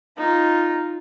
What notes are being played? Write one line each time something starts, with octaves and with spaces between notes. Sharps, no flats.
D#4 F4